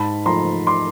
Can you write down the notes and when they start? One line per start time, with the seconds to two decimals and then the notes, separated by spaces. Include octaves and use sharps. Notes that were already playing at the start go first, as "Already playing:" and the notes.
Already playing: G#2 A5 B5
0.26 F3 A3 A#5 C6
0.67 C6 D6